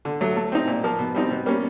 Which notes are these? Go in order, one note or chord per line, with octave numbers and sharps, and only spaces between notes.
D3
F#3 A3
A3
C4 D#4
A#2
F3 A#3
B2
G3 C4 D#4
B2
G3 A#3 C#4